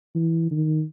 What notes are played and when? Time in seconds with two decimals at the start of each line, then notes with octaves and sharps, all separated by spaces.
0.15 E3
0.51 D#3